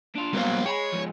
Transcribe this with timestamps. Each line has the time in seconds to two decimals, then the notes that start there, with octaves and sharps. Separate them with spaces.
0.15 D4 F4
0.34 F#3 G3 A#3 B3 C5 F5
0.66 G#3 C#5 G5 B5
0.92 G#2 F3